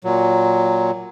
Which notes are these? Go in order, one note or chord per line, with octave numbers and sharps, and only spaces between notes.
A#2 F#3